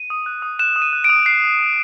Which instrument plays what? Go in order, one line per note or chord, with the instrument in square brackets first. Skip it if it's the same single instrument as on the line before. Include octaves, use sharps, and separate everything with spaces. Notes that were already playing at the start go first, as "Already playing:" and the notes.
Already playing: [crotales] D#7
D#6
F#6
D#6
F#6 E7
D#6
D#7
F#6
D7
D#6
F#6 C7